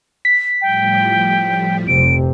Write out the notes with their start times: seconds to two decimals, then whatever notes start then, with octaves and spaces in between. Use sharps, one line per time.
0.25 B6
0.62 A2 F3 G3 G5
1.87 F1 F2 C3 D7